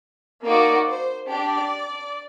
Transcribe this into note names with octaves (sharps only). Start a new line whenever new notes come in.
A#3 D#4 F#4 D5
C5
D4 G4 D5